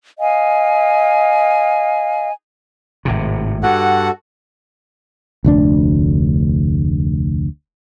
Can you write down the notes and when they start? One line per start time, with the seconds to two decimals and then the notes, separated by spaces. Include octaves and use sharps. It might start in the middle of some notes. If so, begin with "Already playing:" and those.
0.19 D#5 F5 G#5
3.05 G#1 A2 C3
3.63 G2 F#4 A4 F#5
5.44 F1 D2 D4